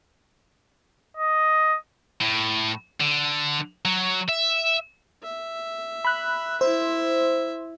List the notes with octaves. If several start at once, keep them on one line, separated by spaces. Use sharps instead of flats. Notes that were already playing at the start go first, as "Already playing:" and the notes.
D#5
A2
D3
F#3
E5
E5
B5 F#6
E4 C5 E5